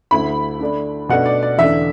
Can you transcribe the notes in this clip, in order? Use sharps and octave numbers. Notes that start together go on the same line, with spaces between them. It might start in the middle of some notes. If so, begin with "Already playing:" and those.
D2 D3 A3 E4 B5
D3 A3 D4
B2 A3 D4 F#5
D5
D5
E2 D3 A3 D4 E5